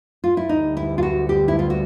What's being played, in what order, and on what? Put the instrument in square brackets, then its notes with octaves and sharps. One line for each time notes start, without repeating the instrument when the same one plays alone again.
[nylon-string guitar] F4
E4
[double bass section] D2 D3 G3 B3 [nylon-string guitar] D#4
[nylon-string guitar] E4
F4
F#4
G4
E4
F4
F#4